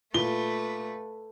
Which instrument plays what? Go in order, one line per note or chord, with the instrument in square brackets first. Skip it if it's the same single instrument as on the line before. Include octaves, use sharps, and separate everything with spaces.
[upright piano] A#2 G7 [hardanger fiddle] A3 [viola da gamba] B4